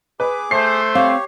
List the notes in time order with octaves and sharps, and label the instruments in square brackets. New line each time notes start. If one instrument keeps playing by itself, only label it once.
[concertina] G#4 D6 [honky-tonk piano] B4
[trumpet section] A3 C5 [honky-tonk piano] C7
[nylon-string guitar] C4 F5 [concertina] G4 C#5